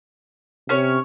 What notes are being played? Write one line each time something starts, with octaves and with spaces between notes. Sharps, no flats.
C3 C#4 C#5